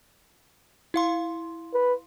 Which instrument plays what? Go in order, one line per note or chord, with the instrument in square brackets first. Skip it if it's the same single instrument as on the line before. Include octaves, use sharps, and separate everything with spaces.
[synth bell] E4 F5 C6
[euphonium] B4